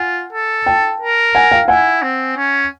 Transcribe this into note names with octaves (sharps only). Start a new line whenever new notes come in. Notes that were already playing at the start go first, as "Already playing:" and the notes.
Already playing: F4 F#5 G#5
A4
G5 A5
A#4
F#5 G#5
F5 G5
E4 F#5 G#5
C4
C#4